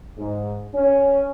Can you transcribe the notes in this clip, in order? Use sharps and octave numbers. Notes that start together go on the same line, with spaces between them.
G#2
C#4